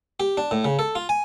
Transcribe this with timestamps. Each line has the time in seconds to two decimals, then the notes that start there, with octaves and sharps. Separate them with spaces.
0.20 G4
0.37 D4
0.51 A2
0.65 C#3
0.79 A4
0.95 F4
1.09 G#5